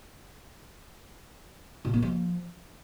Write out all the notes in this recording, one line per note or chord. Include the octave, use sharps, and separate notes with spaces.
A#2
A#3
F3